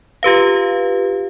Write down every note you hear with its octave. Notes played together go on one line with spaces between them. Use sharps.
F4 G4 B4 F5